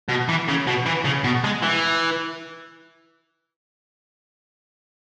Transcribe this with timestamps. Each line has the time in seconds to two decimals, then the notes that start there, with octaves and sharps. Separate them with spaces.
0.09 B2
0.29 E3
0.48 C#3
0.67 B2
0.86 E3
1.05 C#3
1.24 B2
1.44 G#3
1.62 E3